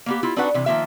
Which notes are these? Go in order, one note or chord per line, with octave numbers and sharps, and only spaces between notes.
A#3 B3 G4
E4 F4
C4 D4 D#4 F#4 B4 F#5
C3 E3
D#3 F3 A#3 E5